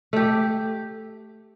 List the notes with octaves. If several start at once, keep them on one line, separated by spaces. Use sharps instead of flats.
A3 G4